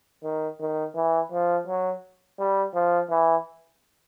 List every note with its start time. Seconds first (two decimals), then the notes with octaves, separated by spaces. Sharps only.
0.23 D#3
0.60 D#3
0.95 E3
1.32 F3
1.67 F#3
2.39 G3
2.74 F3
3.11 E3